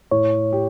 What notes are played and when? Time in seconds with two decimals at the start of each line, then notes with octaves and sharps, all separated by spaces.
0.11 A2 C#5
0.53 G4